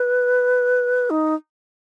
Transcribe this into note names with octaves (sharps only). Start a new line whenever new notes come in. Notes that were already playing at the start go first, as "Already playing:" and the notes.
Already playing: B4
D#4